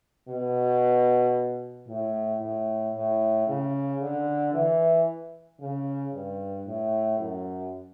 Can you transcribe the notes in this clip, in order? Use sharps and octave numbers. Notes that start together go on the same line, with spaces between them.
B2
A2
A2
A2
C#3
D3
E3
C#3
G2
A2
F#2